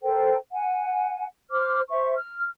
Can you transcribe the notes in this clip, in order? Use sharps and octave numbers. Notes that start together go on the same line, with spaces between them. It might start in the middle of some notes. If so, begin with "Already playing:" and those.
A4 A#4 C5 G5
F#5 G#5
C5 D6 F6
C5 E5 C#6
F6